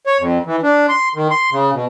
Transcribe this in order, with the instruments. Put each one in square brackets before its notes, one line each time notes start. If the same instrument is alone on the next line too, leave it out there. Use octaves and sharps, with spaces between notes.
[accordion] C#5
F2
E3
D4
C6
D#3
C6
C#3
B2